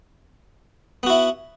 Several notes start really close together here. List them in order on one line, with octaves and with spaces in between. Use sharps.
B3 F#4 E4